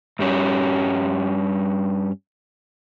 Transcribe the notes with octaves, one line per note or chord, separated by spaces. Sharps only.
G2 G3 C#4